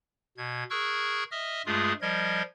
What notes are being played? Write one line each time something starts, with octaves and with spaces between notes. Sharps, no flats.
B2 G#6
G#4 A#4 C#6 E6 F#6 G#6
D#5 E5 D#6 F6
G2 G#3 A3 F4 G#4 D#6
F3 G3 A#4 D#5 G#6